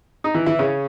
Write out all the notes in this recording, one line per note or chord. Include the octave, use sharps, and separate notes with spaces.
D#4
E3 E4
E3 E4
C#3 C#4